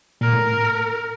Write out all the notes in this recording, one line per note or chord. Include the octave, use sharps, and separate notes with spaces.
A#2 A#4
A2